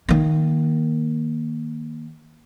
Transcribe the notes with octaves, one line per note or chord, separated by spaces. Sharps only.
D#3 A#3